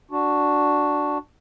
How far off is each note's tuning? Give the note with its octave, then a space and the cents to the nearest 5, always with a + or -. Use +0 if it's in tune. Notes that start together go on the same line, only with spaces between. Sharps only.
D4 +0 F#4 +0